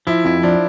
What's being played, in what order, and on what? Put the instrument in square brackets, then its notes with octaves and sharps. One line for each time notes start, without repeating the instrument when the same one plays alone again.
[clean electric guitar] F3 [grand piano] E4
[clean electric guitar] F2 [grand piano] E4
[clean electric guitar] F3 [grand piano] D4